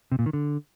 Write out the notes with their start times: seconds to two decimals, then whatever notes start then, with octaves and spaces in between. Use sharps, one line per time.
0.12 C3
0.19 A#2
0.26 D#3
0.33 D3